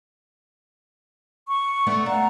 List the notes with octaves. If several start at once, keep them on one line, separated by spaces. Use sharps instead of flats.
C#6
A3 B3 D4
D4 F5 F#5 A#5